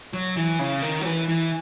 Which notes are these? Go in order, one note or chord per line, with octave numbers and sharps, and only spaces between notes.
F#3
E3
C#3
D#3
F#3
E3
E3